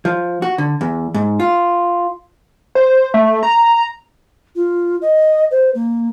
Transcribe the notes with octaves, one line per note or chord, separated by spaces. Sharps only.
F3
F#4
D3
E2
G#2
F4
C5
A3
A#5
F4
D#5
C5
A#3